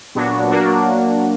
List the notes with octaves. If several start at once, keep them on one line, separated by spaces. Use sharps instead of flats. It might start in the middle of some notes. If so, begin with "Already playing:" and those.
A#2 F#3 B3 D4 F#4
F#3 A#3 D4 F#4